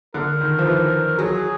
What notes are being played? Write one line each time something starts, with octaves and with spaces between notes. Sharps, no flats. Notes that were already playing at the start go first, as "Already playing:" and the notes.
D3 A#4
D#3
F3
E3
F#3 G#4